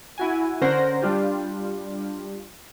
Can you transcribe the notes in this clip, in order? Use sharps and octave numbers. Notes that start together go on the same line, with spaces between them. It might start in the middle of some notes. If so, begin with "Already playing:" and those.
E4 F#4 G#5
D3 C#4 A#4 C5 F#5 A#6
G3 D4 F4 G4